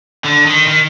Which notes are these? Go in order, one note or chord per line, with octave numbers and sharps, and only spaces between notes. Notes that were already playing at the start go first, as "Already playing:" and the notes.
D3
D#3
D#3